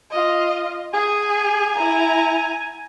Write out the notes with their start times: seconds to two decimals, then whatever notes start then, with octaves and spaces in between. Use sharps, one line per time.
0.11 F4 D#5
0.94 G#4 G#5
1.74 E4 A#5